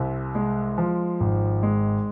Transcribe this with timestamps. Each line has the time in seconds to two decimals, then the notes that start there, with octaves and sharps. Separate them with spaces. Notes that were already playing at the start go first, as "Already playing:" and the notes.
Already playing: C2 C3
0.35 G#3
0.78 F3
1.21 G#1
1.63 G#3